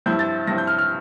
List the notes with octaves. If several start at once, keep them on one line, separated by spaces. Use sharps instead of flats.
G2 F3 C4 E4 G6
A6
G2 F3 C4 E4 A#6
G6
F6
F6